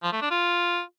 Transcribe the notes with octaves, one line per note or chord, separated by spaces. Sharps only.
F3
A3
D4
F4